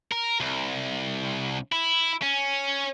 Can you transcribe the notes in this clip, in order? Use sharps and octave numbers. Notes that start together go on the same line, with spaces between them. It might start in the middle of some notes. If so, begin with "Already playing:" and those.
A#4
C2
E4
C#4